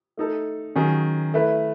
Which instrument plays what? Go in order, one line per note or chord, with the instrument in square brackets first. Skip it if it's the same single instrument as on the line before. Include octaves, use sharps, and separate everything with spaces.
[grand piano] A3 D#4 A4
D#3 F#3 C#4 G#4
A3 E4 B4